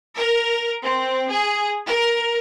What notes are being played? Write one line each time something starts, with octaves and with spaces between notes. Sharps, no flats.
A#4
C4
G#4
A#4